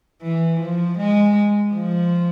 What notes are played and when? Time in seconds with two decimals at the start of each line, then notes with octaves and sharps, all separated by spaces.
0.23 E3
0.60 F3
0.98 G#3
1.74 F3